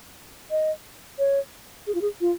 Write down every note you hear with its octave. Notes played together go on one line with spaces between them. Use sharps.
D#5
C#5
G#4
F4
G#4
F4